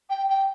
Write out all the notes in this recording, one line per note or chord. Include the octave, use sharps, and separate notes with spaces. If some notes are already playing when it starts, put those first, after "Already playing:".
G5
G5